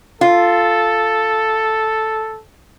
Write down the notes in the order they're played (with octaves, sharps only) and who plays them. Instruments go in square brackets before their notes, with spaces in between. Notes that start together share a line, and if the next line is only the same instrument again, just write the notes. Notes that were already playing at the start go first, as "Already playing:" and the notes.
[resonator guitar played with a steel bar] F4 [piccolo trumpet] A4